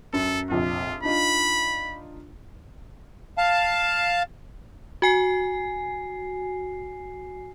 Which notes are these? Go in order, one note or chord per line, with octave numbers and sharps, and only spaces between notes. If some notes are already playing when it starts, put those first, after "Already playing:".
F#2 A4
F1 A#1 F2 F4
D4 D#4 F4 B5
F5 A5
F#4 G#5 C7